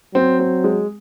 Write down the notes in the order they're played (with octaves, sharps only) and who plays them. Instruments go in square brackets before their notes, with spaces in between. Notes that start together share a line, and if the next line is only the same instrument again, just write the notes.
[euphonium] F#3 [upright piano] C4
[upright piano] C4
G#3